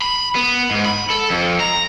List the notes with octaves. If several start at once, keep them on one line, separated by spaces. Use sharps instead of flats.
B5
B3
G#2
B5
A4
F2
A#5